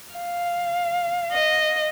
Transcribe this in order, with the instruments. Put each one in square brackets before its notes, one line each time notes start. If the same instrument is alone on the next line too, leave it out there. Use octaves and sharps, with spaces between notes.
[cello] F5
[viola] D#5